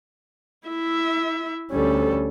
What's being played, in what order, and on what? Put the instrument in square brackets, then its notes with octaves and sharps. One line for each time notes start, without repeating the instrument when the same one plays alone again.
[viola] E4 E5
[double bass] D2 C#4 [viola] G3 A4